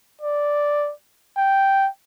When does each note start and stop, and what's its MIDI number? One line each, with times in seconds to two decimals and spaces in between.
0.22 0.92 74
1.38 1.88 79